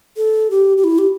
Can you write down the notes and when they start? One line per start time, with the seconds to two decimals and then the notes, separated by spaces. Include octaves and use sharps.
0.17 A4
0.50 G4
0.77 G4
0.84 E4
0.98 G4